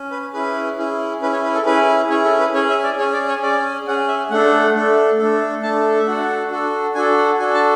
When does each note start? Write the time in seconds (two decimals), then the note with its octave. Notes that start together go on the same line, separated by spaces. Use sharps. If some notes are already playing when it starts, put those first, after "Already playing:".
Already playing: C#4
0.11 B4
0.33 C#4 E4 G#4 B4
0.78 C#4 E4 G#4
1.22 C#4 E4 G#4 B4
1.33 C#5
1.44 B4
1.55 A4
1.66 C#4 E4 G#4 B4
2.10 C#4 E4 G#4 C#5
2.25 A4
2.39 B4
2.54 C#4 G#4 C#5
2.69 E5
2.84 D5
2.98 C#4 G#4 C#5
3.13 D5
3.28 C#5
3.42 C#4 G#4 D5
3.87 C#4 G#4 F#5
4.08 E5
4.31 A3 D4 A4 F#5
4.75 A3 D4 A4
5.19 A3 D4 A4
5.63 A3 D4 A4 A5
5.99 E5
6.07 D4 F#4 A4 F#5
6.51 D4 F#4 A4
6.95 D4 F#4 A4 G#5
7.18 F#5
7.39 D4 F#4 A4 G#5
7.54 A5